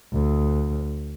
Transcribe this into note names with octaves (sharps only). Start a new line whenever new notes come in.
D2